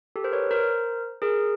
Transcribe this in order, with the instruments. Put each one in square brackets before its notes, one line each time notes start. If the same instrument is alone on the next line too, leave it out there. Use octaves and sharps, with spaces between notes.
[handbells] G4 A4
A#4 C5
B4 C#5
A#4 C5
G#4 A#4